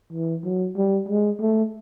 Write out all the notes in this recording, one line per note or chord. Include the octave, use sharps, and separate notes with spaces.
E3
F#3
G3
G#3
A3